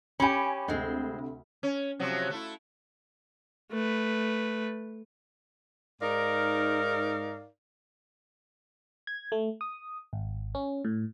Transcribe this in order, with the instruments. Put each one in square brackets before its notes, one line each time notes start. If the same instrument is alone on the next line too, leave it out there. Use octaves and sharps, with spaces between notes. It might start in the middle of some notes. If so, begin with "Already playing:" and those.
[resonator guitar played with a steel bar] C#4 G4 [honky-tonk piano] G#5 B5
[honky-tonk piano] D2 C3 [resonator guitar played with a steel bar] G#3 C4
[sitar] C#4
C3 F3 F#3
A3 E4
[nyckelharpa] A3 B4
[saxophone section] G#2 D#4 A#4 D5 F5
[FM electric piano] G#6
A3
D#6
G#1
C#4
A2